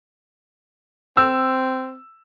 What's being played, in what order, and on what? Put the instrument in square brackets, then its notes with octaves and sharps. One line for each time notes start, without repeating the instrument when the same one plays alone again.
[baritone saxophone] C4 [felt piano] E6